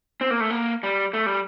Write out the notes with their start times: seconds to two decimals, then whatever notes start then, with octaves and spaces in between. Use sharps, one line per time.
0.21 C4
0.31 A#3
0.40 A3
0.50 A#3
0.83 G3
1.13 A3
1.26 G3